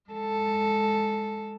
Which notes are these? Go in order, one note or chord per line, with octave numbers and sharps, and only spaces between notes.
G#3 A4